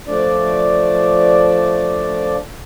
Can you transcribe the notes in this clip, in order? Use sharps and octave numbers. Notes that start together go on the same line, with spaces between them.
F3 A3 D4 D5